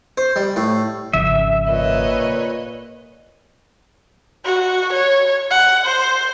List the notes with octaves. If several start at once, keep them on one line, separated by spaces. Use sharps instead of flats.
C5
G3
A2
G#1 C#3 F3 E5
A#2 B4 C#5 D#5
F#4
C#5
F#5
C5